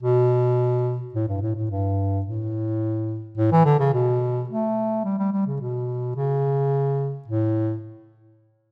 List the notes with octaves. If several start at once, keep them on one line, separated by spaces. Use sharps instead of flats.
B2
A2
G2
A2
A2
G2
A2
A2
E3
D3
C#3
B2
A3
G3
G3
G3
C#3
B2
C#3
A2